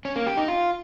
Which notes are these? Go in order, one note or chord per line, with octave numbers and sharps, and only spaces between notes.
C#4
A#3
G4
D#4
F4